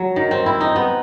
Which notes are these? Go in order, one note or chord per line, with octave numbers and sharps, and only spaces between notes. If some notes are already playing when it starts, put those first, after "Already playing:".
Already playing: F#3
D#3
C4
E4
D#4
B3